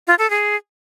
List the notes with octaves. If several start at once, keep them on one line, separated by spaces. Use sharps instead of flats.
F4
A4
G#4